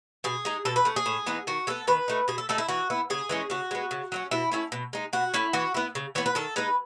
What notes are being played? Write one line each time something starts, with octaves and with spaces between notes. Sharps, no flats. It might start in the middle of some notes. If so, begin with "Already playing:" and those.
B2 G#4
G#3 D#4
B2 A4
B4
A3 C#4
G#4
A2
E3 B3 D#4
D#3 F#4
G#3 B3 A4
D#3 B4
A3 D#4
B2 G#4
A4
A3 D#4 A4
E4
E3 F#4
B3 E4
C#3 G#4
E3 G#3 C#4
C#3 F#4
G#3 B3
C#3
F#3 A3 C#4
B2 E4
A3 C#4 E4
B2
G#3 D#4
B2 F#4
A3 C#4 E4
E3 F#4
B3 E4
C#3
E3 B3 C#5
B4
D#3 A4
G#3 D#4 B4